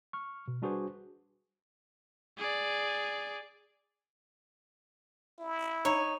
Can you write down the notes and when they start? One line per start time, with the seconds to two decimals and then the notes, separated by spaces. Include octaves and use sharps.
0.13 C#6 F6
0.48 B2
0.62 G3 D4 F#4 G#4 B4 C5
2.38 G#4 D5
5.39 E4
5.85 D#4 C#5